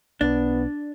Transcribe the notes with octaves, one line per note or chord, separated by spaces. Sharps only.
B1 B3 D4